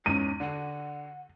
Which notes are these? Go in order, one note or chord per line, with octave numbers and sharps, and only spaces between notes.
E2 G#2 C#4 D#7
D3 F#5